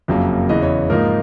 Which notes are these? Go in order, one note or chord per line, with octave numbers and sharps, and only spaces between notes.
F#1 F2 C#3 F#3 A#3
E2 C#3 E3 D#5
C#5
G#2 F3 A#3 D#4 A#4